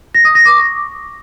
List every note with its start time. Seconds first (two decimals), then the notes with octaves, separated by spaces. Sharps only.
0.15 A#6
0.25 D#6
0.35 A#6
0.45 D6
0.56 C#6